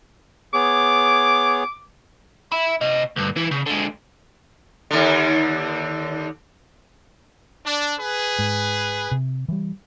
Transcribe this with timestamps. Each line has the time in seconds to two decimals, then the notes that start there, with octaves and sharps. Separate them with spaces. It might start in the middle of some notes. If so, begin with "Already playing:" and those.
0.54 B3 G#4 C#5 D6
2.52 E5 B5
2.81 C3 D#5
3.16 D2 G2
3.36 E3 E4
3.51 C#3
3.66 D3 G#3
4.91 D#2 D3
7.66 D4
8.00 G#4 B4
8.39 G#2
9.11 C3
9.48 E3 G3